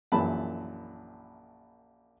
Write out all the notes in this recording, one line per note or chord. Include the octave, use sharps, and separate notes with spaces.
A#1 F#2 E3 A5 B5